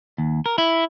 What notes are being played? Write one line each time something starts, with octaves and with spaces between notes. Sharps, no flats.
D#2
A#4
E4